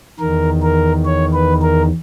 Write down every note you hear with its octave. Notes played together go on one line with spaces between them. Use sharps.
E2 D#3 A#4
A#4
C#5
B4
A#4